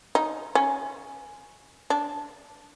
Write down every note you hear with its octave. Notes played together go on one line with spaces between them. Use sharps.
D#4
C#4
D4